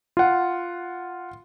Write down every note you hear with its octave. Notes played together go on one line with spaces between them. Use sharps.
F4 F#5